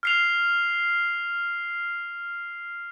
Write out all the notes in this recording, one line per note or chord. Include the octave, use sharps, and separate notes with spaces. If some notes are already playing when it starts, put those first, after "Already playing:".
F6 C7 F7